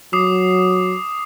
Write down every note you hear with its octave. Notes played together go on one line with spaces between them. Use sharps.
F#3 D6 D#6 C7